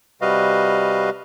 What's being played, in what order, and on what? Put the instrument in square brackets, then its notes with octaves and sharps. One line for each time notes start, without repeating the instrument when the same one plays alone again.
[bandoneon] C3 G3 F#4 B4 D#5 F5